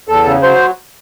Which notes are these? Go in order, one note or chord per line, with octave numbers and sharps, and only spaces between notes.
E2 A4
C#3
F#3 C5